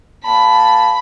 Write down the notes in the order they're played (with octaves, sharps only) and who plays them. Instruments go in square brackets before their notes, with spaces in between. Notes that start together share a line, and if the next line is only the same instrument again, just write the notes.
[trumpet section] A#3 A5 [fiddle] B5